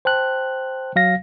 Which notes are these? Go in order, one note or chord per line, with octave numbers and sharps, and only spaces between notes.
C5 G5 A5 F#6
F#3 F5 A#6